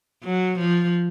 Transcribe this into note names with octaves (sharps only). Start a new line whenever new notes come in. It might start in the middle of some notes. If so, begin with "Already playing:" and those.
F#3
F3